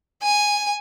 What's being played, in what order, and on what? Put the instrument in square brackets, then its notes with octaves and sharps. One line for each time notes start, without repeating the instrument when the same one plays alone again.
[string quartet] G#5